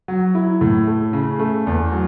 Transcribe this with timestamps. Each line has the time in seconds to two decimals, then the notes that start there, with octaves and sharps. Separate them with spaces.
0.08 F#3
0.35 E4
0.61 A2
0.87 A3
1.13 C#3
1.40 A3
1.67 E2
1.92 F#3